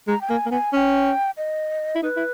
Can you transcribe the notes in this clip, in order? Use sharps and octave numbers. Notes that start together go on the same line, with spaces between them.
G#3 A#5
G5
A#3 G#5
A#3
B3 G#5
C#4 G5 G#5
D#5
E4
D#4 B4
E4